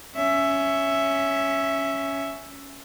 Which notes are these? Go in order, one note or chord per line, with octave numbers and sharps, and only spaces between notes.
C#4 E5